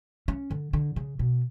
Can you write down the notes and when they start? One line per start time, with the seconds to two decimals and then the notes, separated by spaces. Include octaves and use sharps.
0.28 C#4
0.51 D3
0.73 D3
0.96 C#3
1.19 B2